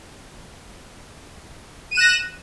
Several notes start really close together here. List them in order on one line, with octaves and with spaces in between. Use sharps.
D#7 E7 F#6 A#6